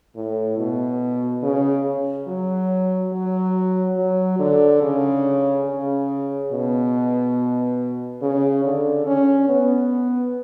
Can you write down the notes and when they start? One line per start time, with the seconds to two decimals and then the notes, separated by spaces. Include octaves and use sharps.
0.16 A2
0.58 B2
1.43 C#3
2.28 F#3
3.13 F#3
3.97 F#3
4.39 D3
4.82 C#3
5.67 C#3
6.52 B2
8.22 C#3
8.65 D3
9.07 C#4
9.49 B3